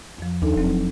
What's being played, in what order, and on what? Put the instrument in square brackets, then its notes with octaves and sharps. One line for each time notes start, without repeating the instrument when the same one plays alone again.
[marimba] F2 F3
[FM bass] D#2 [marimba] D4 D#4 A4
[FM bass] E1 [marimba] F3 F#3 C4